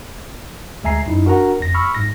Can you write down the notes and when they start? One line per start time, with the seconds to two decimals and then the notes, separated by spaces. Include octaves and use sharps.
0.84 D2 G#3 E5 G#5 A#5 C7
1.06 F#2 D#4 E4
1.25 D4 F#4 A#4 F#5 A#5
1.60 F2 A#6
1.74 B5 C#6 E6 F6
1.95 G#2 A#6